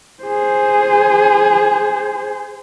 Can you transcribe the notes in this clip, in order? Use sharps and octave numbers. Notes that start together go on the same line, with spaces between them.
G#4 C5